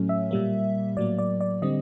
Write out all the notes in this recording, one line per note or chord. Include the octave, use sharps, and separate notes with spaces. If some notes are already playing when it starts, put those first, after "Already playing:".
Already playing: A2 F#3 A3 C#4
E5
A#2 G3 A#3
A2 F#3 A#3 D5
D5
D5
D3 G3 C4 D#5